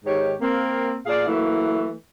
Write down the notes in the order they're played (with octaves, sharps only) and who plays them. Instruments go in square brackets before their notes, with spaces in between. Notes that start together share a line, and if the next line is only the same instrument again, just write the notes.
[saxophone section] G#2 D#3 G4 C#5
A#3 C4
A#2 G#4 D5 F5
E3 F#3 A3 A#3 E4